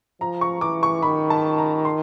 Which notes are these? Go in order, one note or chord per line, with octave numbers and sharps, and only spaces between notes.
F3 A#5
C#6
E3 D6
C#6
D#3 B5
A5
A#5
C6